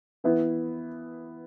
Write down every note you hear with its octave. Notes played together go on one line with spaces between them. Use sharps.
E3 B3 E4